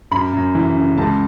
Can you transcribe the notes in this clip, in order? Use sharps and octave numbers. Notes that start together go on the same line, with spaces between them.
F#2 B5
F#2
E3
C#3
C#2 A5